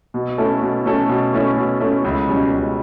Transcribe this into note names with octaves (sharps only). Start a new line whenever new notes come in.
B2
A3 C#4 E4 A4
B2
A3 C#4 E4 A4
B2
A3 C#4 E4 A4
B2
A3 C#4 E4 A4
C#2
B2 G3 C#4
C#2